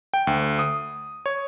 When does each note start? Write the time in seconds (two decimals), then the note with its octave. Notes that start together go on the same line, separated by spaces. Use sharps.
0.14 G5
0.27 D2
0.59 D#6
1.26 C#5